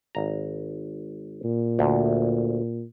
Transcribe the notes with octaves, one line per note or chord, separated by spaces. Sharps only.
G#1 A#5
A#2
D2